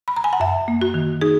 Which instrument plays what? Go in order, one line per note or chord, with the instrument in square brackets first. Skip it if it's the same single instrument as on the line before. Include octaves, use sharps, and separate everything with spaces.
[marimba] B5
A#5
G#5
F#5
F#2 E5
A#3
F#4
D#3
D#4 G#4